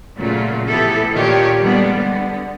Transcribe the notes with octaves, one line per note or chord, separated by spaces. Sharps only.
A#2 C#3 F#3 A3 F4
A2 E3 B3 E4 G4 A4
A#2 D#3 D4 F4 G4 C#5
D3 G3 G#3 A#3 B3 D4
D3 B3